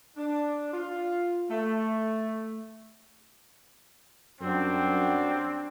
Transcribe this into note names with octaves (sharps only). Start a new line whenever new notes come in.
D4
F4
A3
F#2 F#3 G3 C4 D4